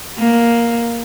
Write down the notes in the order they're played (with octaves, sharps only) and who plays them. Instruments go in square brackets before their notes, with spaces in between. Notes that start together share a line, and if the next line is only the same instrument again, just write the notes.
[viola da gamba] A#3